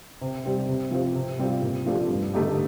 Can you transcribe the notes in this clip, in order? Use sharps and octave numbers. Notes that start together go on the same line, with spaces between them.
C3
G3 C4 G4
C3
F3 C4 G4 C5
C3
G3 C4 F4
A#2
F3 A3 D4 G4
G2
D3 A3 D#4 G4